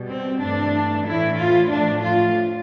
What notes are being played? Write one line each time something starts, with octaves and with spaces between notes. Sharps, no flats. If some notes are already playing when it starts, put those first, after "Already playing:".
Already playing: B2 G3
C4
G2 E3 A3 D4
A2 E3 A3 E4
F4
A2 F3 A3 D4
F4